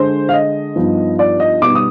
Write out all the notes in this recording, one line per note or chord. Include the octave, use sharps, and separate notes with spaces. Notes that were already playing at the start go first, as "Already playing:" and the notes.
Already playing: D3 G#3 D4 C5
F5
D#5
G2 F3 B3 D#4
D5
D#5
B2 G3 B3 D#4 D6
D#6